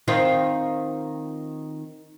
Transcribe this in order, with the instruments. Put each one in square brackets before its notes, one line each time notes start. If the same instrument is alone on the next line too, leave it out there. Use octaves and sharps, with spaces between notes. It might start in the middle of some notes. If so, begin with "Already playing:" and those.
[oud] D#3 C4 F4